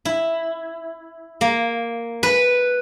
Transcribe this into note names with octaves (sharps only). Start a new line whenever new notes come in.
E4
A#3
B4